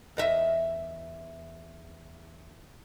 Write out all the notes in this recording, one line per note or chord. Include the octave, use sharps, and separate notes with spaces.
E2 D#5 E5